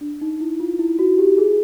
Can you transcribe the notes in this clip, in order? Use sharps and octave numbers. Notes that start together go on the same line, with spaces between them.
D4
D#4
E4
F4
E4
F#4
G4
G#4